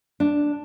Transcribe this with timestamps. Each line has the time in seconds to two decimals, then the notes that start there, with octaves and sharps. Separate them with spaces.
0.20 D4